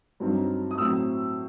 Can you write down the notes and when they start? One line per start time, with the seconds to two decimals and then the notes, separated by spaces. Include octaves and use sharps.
0.20 G2 F#3 C4 D#4
0.71 D#6
0.78 A2 F#3 C4 E6